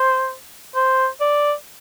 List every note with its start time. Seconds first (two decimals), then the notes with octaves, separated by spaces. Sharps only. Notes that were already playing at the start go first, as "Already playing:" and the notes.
Already playing: C5
0.75 C5
1.20 D5